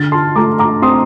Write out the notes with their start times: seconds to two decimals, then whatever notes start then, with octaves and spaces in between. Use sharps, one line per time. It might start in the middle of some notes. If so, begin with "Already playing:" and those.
Already playing: D3 F6 A6
0.12 A5 C6
0.35 A3 A#5 D6
0.59 A#5 D6
0.82 C4 C6 D#6